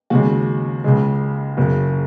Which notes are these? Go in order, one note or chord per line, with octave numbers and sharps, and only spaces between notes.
D#2 C#3 G#3 F#4
C#2 C#3 G#3
F#1 F#2 C#3